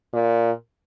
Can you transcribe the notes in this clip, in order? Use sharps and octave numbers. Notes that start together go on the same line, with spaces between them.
A#2